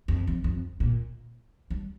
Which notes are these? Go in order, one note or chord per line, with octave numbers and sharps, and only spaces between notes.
F2
F2
F2
A#2
G3